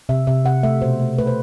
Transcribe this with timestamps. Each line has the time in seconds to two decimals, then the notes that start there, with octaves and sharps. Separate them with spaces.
0.09 C3 E5
0.27 C3 E5
0.45 C3 F#5
0.63 A3 E5
0.82 B2 C5
1.00 A3
1.18 A3 B4
1.27 C5